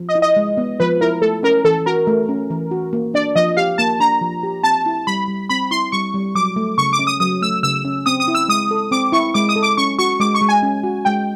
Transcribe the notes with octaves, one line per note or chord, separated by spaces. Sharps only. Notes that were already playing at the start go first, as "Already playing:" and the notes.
Already playing: F3
D#5
E4
D#5
G#3
B3
F3 B4
E4 A#4
A3 A4
C#4 A#4
E3 A4
F#4 A#4
A3
C#4
E3
F#4
A#3
D4 D5
F3 D#5
G4 F5
A#3 A5
D4 A#5
F3
G4
C4 A5
E4
G3 B5
G3
C4 B5
E4 C6
G3 C#6
G3
F#3 D6
A3
C#3 C#6
D6
C#4
D#6
F#3 D#6
A3 E6
C#3 E6
C#4
C4 D#6
D#6
E4
E6
G#3 D#6
A4
C4 D6
E4 C#6
G#3 D6
D#6
A4
D6
C#4 C#6
F#4 C#6
G#3 D6
C#6
G#3
G#5
C#4
F#4
G#3 G5